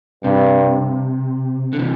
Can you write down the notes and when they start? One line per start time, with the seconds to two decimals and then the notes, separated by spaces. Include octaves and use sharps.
0.24 G2 C3
1.73 D3
1.79 C3 E3